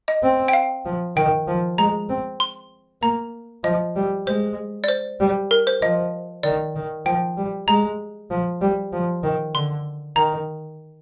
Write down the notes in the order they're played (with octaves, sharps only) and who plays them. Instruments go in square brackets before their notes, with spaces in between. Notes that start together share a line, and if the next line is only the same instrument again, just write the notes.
[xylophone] D#5
[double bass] C4
[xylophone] G5
F5
[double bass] F3
[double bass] D#3 [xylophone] G5
[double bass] F3
[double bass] G#3 [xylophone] A#5
[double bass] C4
[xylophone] C6
[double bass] A#3 [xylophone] A#5
[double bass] F3 [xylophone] D#5
[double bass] G3
[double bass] G#3 [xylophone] C5
[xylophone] D5
C5
[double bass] G3
[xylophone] A#4
C5
[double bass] F3 [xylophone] D#5
[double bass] D#3 [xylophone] D5
[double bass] D#3
[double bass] F3 [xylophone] G5
[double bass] G3
[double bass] G#3 [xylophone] A#5
[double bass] F3
G3
F3
D#3
[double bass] D3 [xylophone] C6
[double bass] D#3 [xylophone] A#5